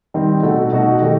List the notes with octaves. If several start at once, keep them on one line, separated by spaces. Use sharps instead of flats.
D#3 G3 C4 D#4
B2 A3 D#4 F#4
B2 A3 D#4 F#4
D#3 A3 D#4 G4